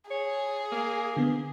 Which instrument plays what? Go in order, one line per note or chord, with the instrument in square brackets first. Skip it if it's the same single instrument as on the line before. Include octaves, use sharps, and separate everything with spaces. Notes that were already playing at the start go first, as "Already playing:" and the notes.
[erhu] G#4 [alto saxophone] C#5
[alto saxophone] A#3
[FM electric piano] D3 B3